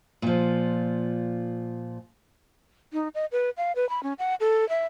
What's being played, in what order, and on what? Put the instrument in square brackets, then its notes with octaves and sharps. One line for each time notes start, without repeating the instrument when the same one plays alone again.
[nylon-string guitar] A#2 F3
[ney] D#4
D#5
B4
F5
B4
B5
C#4
F#5
A4
E5